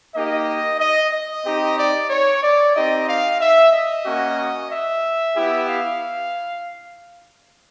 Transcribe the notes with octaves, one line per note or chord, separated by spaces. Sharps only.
A#3 D#4 G4 D#5
D#5
D#5
C4 D#4 G4
D5
C#5
D5
C4 D#4 G4 D#5
F5
E5
D#5
A#3 C#4 F#4
E5
B3 E4 G4
F5